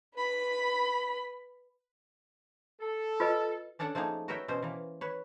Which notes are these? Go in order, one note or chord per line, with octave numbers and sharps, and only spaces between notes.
B4 B5
A4
F4 B4 D#5
C#4 D4 A4 C#5 D5 F#5
F3 A3 A#3 D#4 G#4
F#4 A#4 B4 C#5 E5 G5
B2 E3 C#4 C5
E3 A#3
B4 C#5